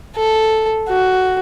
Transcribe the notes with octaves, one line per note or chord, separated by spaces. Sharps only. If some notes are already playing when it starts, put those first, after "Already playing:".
A4
F#4